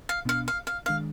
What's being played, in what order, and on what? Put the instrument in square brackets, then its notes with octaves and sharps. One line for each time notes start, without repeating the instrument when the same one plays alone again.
[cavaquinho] F5
[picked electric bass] B2 B3 D4 [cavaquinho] F5
[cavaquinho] F5
F5
[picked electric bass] D#3 G#3 D4 [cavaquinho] F5